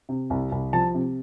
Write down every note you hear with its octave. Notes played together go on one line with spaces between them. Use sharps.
C3
C2
C2
F3 A5
C3